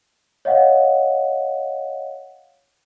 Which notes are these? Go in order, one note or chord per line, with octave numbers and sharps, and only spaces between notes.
C#5 D#5 F5 F#5